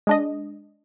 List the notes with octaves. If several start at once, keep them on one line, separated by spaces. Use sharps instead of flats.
G#3 D4 D#5